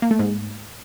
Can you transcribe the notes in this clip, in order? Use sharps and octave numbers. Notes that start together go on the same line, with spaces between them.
A#3
A3
G#2